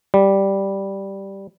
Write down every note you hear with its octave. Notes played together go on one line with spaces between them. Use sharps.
G3